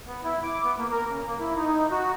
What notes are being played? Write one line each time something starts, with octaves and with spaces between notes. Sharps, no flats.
B3
E4
D6
B3
A#3
A#4
C#3
A#3
E4
D#4
F#4